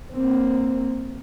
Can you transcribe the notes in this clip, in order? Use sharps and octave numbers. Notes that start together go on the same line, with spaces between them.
A#3 C4